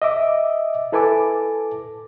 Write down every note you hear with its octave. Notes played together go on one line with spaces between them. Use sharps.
D#5 E5 D6
E4 A4 B4 G#5 A5 D6